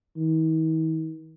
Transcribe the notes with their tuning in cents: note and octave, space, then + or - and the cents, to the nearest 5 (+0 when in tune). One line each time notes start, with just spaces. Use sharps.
D#3 +45